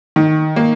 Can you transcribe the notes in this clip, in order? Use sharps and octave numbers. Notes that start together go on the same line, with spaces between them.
D#3
A#3